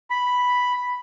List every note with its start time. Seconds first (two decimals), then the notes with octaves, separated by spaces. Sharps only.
0.10 B5